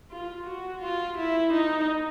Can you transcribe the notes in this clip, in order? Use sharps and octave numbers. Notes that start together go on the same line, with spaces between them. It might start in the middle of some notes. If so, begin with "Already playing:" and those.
F4
F#4
F4
E4
D#4